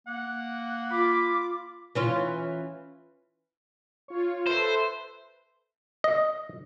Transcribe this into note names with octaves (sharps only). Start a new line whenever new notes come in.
A#3 F#5
F4 B5 D6
E3 C#4 F4
F4 C#5
A4 B4 C5 E5
D#5